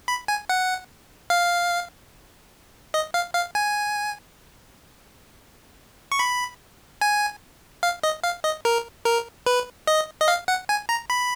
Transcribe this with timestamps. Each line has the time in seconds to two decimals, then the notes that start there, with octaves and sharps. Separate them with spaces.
0.08 B5
0.28 G#5
0.49 F#5
1.30 F5
2.94 D#5
3.14 F5
3.35 F5
3.55 G#5
6.12 C#6
6.19 B5
7.01 G#5
7.83 F5
8.03 D#5
8.24 F5
8.44 D#5
8.65 A#4
9.05 A#4
9.46 B4
9.87 D#5
10.21 D#5
10.28 F5
10.48 F#5
10.69 G#5
10.89 A#5
11.10 B5